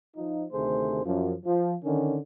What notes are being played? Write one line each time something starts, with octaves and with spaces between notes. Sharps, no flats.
F3 D#4
D2 C3 D#3 A3 G#4 C5
F#2 F3
F3
D3 D#3 C#4